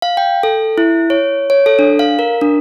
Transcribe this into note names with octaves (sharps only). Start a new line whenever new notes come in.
F5
G5
A4
E4
C#5
C#5
A4
D4
F5
A#4
D4